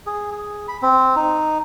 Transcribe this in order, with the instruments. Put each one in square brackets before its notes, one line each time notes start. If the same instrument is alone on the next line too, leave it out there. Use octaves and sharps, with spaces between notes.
[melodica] G#4
G#4
B5
C4
D#4